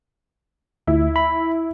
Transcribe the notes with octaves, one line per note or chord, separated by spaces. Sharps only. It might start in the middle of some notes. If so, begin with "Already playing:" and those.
D2 E4
B5